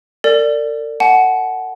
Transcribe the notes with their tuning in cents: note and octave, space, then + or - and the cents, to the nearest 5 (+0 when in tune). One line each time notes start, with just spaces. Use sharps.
A#4 -45 D5 +0
F#5 +10 A5 -45